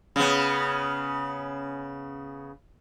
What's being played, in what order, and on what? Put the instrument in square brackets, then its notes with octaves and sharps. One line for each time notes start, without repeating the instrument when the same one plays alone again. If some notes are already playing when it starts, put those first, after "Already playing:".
[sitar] C#3 B3